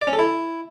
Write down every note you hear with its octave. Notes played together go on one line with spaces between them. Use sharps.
D5
C#4
A4
E4